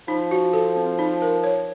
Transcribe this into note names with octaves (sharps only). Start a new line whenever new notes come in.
F3 D#4
F#4
A4
C4
D#4
A#4
C#5